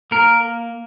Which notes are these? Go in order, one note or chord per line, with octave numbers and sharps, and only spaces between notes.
A#3 A#4